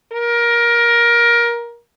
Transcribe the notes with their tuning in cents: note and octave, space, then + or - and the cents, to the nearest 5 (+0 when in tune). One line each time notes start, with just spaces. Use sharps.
A#4 +20